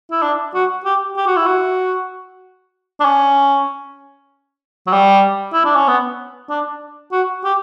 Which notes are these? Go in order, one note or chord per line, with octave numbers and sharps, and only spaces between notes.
E4
D4
F#4
G4
G4
F#4
E4
F#4
D4
C#4
F#3
G3
E4
D4
C#4
B3
D4
F#4
G4